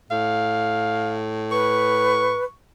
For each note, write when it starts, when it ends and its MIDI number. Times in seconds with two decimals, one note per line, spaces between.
0.11 2.40 45
0.11 1.15 77
1.51 2.45 71
1.51 2.52 85